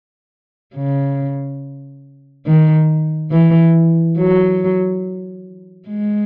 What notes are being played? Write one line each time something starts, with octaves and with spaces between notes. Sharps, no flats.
C#3
D#3
E3
F#3
G#3